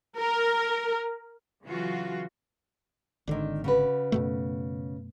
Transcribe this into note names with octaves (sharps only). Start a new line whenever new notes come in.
A#4
C#3 E3 F#3 F4 F#4
G#1 D3 D#3 D4
C#3 F#4 B4
F#2 B2 A3